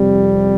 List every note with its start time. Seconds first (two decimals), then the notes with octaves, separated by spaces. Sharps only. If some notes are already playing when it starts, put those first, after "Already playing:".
Already playing: F2 C3 G3